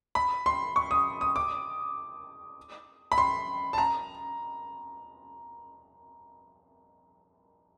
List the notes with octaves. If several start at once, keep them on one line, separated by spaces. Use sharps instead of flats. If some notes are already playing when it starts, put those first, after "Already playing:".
B5
C6
C#6
D#6
D#6
D6
B5
C6
A5
A#5